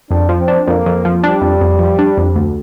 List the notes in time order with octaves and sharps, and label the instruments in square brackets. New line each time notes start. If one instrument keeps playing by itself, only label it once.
[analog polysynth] F2 [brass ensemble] D4
[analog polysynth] F3
[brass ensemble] C4
[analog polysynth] D4
[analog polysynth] F2 [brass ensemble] A#3
[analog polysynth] F2
F3
[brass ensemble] G3 [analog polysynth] D4
[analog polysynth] F2
F2
F3
D4
F2
D2